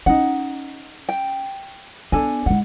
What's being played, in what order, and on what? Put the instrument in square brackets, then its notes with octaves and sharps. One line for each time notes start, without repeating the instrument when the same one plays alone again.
[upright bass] C#4 [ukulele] D#4 F#5
[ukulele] G5
[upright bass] B3 [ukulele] D4 A4 G#5
[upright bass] G#3 E4 [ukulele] F#5